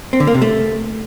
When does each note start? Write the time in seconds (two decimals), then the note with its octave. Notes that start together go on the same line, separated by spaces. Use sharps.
0.13 C4
0.20 D3
0.27 A#3
0.34 C3
0.42 A3